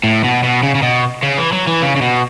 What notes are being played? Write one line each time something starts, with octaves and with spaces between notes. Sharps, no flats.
A2
B2
B2
C#3
C#3
B2
C#3
E3
F#3
E3
C#3
C#3
B2